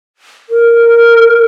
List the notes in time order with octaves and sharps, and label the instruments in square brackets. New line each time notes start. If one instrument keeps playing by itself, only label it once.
[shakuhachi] A#4